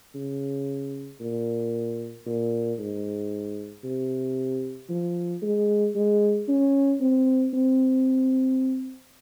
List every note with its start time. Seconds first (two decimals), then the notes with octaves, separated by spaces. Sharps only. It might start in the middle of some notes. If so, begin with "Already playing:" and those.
0.15 C#3
1.21 A#2
2.26 A#2
2.79 G#2
3.84 C3
4.90 F3
5.42 G#3
5.96 G#3
6.48 C#4
7.01 C4
7.54 C4